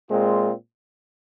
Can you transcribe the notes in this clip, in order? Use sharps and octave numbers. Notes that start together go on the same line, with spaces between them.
A#2 G#3 C4 F4